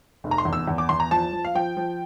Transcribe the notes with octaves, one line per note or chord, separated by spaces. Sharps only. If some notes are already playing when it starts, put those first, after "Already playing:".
F1
A#5
C6
E2
E6
E2
D6
E2 C6
A#5
F3 A5
F3
F5
F3 G5
F3